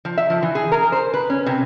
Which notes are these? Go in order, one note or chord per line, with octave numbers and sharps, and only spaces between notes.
F3
E5
F3
E3
G#4
A#4
C5
B4
C#4
C3